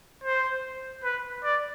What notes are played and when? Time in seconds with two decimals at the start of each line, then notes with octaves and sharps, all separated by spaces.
0.24 C5
1.04 B4
1.44 D5